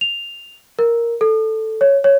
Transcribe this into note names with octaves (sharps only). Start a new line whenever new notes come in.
F7
A#4
A4
C#5
C#5